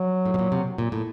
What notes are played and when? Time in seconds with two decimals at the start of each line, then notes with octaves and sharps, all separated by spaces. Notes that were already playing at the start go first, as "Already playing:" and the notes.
Already playing: F#3
0.26 A2
0.34 B2
0.39 A#2
0.52 C3
0.78 A#2
0.92 A2